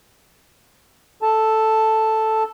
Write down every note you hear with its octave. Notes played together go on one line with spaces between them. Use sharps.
A4 A5